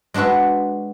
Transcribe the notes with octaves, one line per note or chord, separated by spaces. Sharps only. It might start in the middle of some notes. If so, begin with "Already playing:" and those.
G#3 D4 F#4 B4 E5